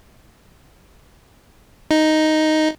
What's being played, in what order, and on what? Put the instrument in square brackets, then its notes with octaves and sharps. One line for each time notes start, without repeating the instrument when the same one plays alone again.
[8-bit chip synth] D#4